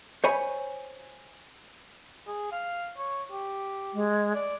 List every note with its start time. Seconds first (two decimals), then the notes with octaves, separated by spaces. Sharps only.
0.24 C5 C#5 G#5 B5
2.27 G#4
2.52 F5
2.98 C#5
3.32 G4
3.93 G#3
4.34 D5